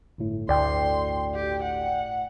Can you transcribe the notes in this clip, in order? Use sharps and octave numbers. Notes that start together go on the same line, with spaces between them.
G1 A2
D2 D5 G5 C6
G4
F#5